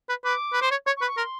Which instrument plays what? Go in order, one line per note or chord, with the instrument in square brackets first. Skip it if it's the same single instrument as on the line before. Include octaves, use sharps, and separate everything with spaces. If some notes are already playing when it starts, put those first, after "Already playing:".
[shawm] B4
[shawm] B4 [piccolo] D6
[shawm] B4
C5
C#5
[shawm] C#5 [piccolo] C#6
[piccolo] C#6
[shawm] B4
[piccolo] C#6
[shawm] A#4 [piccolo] C6